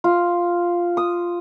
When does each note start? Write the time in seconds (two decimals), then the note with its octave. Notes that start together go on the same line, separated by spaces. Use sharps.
0.04 F4
0.97 D#6